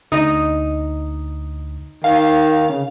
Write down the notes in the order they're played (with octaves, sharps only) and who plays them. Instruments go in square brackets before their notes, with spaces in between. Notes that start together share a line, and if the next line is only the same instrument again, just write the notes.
[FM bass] D2 [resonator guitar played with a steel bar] D#4 D#5
[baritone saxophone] D#3 [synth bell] F5
[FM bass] C#3